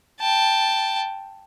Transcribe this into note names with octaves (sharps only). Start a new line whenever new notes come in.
G5 A5